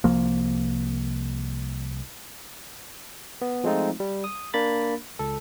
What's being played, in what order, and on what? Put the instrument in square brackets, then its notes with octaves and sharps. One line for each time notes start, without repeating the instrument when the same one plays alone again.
[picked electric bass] C2 F3 A#3
[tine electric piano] B3
F3 G#3 A3 C4 D#4 F4
G3
D#6
A#3 D4 B5 A6
C#2 A4